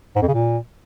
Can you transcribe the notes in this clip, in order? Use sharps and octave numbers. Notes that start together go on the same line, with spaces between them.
G#2
F2
C#3
A#2